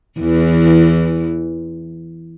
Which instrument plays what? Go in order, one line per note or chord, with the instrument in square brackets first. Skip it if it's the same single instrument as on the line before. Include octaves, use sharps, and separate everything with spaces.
[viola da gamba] E2 E3